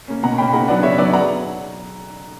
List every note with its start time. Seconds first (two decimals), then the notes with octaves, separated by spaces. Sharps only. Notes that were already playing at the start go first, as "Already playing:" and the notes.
0.08 A#3 C#4
0.23 B2 F#5 A#5
0.38 A#3 C#4 G5 B5
0.53 C#3 F#5 A#5
0.68 F#3 B3 D4 D5 F#5
0.83 C#3 C#5 E5
0.98 F#3 B3 D4 D5 F#5
1.13 F#5 A#5